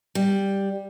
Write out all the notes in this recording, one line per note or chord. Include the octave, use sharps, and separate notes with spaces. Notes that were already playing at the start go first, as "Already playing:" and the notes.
G3